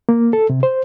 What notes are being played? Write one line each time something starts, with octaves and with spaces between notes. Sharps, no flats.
A#3
A4
C3
C5